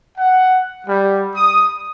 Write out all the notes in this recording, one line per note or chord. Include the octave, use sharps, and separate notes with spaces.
F#5
G3
D#6